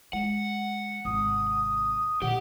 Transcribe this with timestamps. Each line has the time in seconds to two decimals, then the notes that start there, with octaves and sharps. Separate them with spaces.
0.13 G#3 F#5
1.05 G#1 C3 D#6
2.22 A#2 D3 G4 F#5